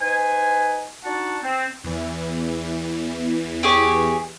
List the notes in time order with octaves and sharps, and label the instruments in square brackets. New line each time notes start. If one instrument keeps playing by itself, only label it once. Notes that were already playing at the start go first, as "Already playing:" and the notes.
[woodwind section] D#4 B4 C5 G#5
D4 D#4 F#4 F#5 A5
C4
[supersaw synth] E2 E3
[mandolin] G4 G#4 C#5